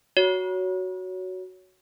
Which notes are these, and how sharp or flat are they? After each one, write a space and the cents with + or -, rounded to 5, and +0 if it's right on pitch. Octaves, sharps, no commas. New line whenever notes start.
F#4 +0 C#5 +15